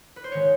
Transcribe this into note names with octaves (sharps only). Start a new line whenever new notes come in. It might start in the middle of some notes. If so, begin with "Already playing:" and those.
B4
C5
D#3 G#3 C#5